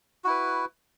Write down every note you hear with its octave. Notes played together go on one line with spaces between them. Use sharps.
E4 F#4 B4